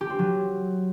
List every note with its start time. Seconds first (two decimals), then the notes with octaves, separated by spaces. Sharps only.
0.01 G4
0.10 C4
0.19 F#3